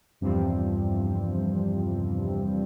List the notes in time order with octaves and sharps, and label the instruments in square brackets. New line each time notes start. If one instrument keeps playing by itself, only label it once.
[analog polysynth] E2 G2 C3 F3 G3 C4